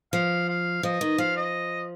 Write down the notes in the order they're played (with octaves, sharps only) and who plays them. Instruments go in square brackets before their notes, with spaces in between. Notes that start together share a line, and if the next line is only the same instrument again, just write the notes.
[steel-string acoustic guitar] F3 [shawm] F5
[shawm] F5
[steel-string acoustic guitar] F3 [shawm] D#5
[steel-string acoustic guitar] D#3
[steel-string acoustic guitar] F3 [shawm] F5
[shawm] D#5